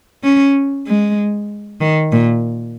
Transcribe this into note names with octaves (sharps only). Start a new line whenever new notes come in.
C#4
G#3
D#3
A#2